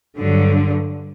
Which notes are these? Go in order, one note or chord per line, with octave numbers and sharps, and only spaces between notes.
G2 D3 F#3